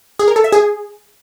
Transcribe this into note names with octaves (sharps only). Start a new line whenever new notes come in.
G#4
A#4
A4
E5
G#4